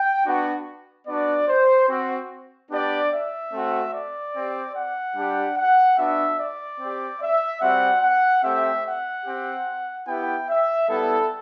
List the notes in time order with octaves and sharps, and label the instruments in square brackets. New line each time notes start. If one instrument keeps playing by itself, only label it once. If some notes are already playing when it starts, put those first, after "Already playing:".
Already playing: [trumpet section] G5
B3 D4 F#4
B3 D4 F#4 D5
C5
C4 F#4
B3 D4 G4 D5
E5
A3 C4 F#4
D5
C4 G4
F#5
G3 D4 G4
F#5
B3 D4 F#4 E5
D5
C4 G4
E5
G3 C4 F#4 F#5
F#5
A3 C4 G4 E5
F#5
C4 G4
B3 E4 G4 G5
E5
G3 B3 E4 A4